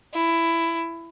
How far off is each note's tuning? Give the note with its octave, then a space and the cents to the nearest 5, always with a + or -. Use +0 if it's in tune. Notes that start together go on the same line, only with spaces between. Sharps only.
E4 +10